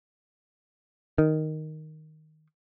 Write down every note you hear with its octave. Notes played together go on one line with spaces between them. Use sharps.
D#3